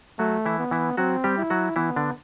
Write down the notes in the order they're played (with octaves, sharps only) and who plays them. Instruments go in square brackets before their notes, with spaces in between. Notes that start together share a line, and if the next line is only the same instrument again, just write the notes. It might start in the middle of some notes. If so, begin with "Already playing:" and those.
[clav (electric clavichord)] F#3 F#4 [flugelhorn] A3
[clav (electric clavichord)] E3 E4
[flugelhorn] B3
[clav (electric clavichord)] E3 E4
[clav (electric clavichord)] F#3 F#4 [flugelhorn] C4
[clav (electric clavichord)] G3 G4
[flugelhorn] E4
[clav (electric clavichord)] F#3 F#4
[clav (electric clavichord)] E3 E4 [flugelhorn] B3
[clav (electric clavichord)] D3 D4